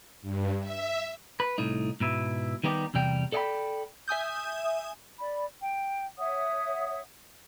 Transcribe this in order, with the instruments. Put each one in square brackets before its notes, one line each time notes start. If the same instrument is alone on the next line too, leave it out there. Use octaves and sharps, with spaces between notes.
[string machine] G2
E5
[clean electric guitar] B4
C2 A2 D#4
G#2 B2 E4
D#3 G3 B3 D#4 G4
E2 C3 G3 G5
A4 D5 D#5 F#5 G5 B5
[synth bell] E5 G#5 D#6 G6
[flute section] D5 B5
G5
C#5 E5 F#5 D#6